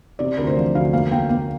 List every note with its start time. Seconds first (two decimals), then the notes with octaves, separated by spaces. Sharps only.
0.19 C3 D5
0.37 D2 A#4
0.47 C5
0.56 F3 D5
0.75 D2 F5
0.93 A#3 F5
1.11 A#3 G5
1.29 A#3 F5